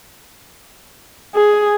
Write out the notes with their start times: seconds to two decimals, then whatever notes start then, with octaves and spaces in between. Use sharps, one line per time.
1.35 G#4